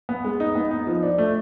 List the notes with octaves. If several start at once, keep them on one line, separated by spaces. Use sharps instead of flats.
B3
G#3
D#4
B3
D#4
F3
D4
A3